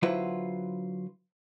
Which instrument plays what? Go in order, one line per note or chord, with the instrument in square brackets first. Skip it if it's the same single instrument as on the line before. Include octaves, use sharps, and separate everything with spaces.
[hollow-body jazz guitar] D3 F#3 E4 F4 B4 C5